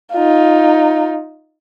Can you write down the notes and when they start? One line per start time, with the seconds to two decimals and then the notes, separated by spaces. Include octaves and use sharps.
0.13 D#4 F4